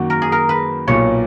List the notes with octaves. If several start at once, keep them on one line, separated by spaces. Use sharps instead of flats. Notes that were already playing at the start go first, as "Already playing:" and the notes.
Already playing: F#2 D#3 A#3 F#4
A#4
G#4
A#4
B4
B1 A#2 A#3 C#5